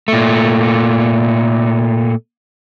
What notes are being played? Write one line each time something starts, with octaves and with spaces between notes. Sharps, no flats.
A#2 A3